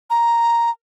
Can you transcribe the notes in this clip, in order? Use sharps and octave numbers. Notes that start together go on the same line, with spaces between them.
A#5